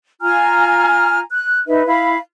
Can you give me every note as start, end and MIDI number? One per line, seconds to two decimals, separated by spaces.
0.21 1.20 65
0.21 1.20 80
0.21 1.20 82
0.21 1.20 89
1.30 1.60 90
1.66 1.85 63
1.66 1.85 71
1.66 1.85 76
1.86 2.16 64
1.86 2.16 77
1.86 2.16 83